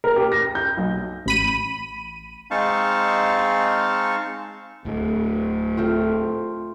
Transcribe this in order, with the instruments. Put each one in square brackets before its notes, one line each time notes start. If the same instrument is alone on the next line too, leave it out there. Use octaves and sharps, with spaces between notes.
[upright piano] A#4
G4
A#6
G6
B1
[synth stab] A1 B5 D#7
[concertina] G#3 C4 D#4 F5 A5 C#6
[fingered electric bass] D1 A2
[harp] A3 C4 F4